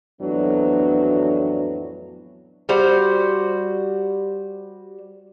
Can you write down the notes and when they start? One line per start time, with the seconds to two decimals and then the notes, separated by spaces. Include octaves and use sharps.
0.22 F2 A2 E3 F#3 B3 D4
2.69 G3 F#4 C5